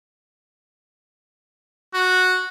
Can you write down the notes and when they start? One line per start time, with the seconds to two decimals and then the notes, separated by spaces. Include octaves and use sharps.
1.93 F#4